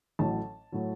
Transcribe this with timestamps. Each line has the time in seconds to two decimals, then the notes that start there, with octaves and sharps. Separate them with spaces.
0.19 A1 A2 F#3 A5
0.72 A2 F#3